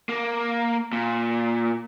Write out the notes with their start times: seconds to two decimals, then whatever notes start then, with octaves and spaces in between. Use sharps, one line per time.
0.09 A#3
0.93 A#2